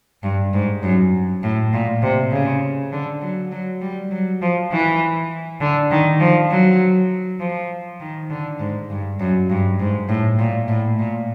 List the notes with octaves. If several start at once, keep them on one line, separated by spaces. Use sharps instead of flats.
G2
G#2
F#2
A2
A#2
C3
C#3
D3
F#3
F#3
G3
F#3
F3
E3
D3
D#3
F3
F#3
F3
D#3
D3
G#2
G2
F#2
G2
G#2
A2
A#2
A2
A#2